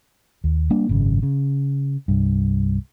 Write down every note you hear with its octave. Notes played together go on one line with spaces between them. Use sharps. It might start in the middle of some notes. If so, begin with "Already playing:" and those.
D#2
G3 A#3 D4
G#1 F#2 C#3
C#3
C2 G2